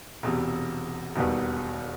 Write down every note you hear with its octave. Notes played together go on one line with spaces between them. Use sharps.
E1 E2 C3
E1 D#2 D#3 G3 B3